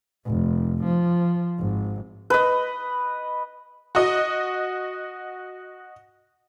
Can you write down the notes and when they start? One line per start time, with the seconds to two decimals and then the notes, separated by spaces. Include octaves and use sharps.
0.26 F1
0.84 F3
1.58 G#1
2.30 B4 D#5
3.95 F#4 D#5